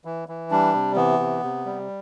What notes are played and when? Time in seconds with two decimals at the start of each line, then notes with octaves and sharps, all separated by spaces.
0.05 E3
0.29 E3
0.51 G3 D4
0.74 C3
0.96 E3 B3
1.19 C3
1.43 C3
1.66 G3